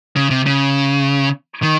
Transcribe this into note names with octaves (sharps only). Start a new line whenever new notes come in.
C#3
C3
C#3
D#3